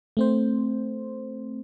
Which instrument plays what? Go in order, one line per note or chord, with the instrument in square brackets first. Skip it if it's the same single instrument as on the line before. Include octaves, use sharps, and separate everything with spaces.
[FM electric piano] A3 C4 C5